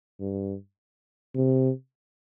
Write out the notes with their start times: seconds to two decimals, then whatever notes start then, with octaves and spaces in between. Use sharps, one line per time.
0.20 G2
1.35 C3